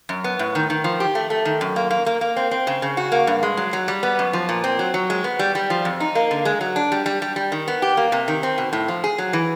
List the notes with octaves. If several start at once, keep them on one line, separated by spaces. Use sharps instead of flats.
F#2
B3
A2
D#3
D#3
F3
G4
A3
A3
D#3
F#2
A#3
A#3
A#3
A#3
C4
C4
C#3
C#3
F#4
A#3
G2
G#3
F#3
F#3
G3
B3
F#2
F3
A#2
C4
F#3
F#3
G#3
B3
G3
G3
F3
F2
D#4
A#3
D3
G#3
F#3
D4
G3
G3
G3
G3
D#3
B3
G4
A#3
C3
D#3
C4
B2
A2
F3
G#4
F#3
E3